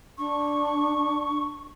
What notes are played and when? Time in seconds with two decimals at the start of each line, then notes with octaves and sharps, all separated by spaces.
0.18 D4 C#6